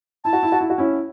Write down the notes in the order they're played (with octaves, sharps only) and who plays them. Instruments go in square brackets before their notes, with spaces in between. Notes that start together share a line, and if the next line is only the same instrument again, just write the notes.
[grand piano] E4 [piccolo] A5
[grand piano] F#4
E4
F#4
E4
F#4
C#4 E4